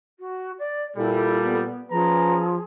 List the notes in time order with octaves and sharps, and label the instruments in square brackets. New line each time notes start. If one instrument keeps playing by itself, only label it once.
[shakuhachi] F#4
D5
[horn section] A#2 G3 [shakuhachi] E4 [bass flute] A4
[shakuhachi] B3
[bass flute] F3 [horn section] C#4 B4 A#5 [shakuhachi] G#4